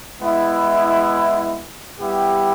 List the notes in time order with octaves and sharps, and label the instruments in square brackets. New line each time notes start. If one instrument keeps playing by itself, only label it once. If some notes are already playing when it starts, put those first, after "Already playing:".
[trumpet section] G#3 B3 E4
G3 B3 E4 G4